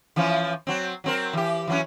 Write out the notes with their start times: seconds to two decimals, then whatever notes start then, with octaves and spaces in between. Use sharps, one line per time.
0.16 E3 F3 C#4
0.67 F#3 C4
1.04 F#3 C4 A#4
1.33 E3 G4
1.67 E3 F#3 C#4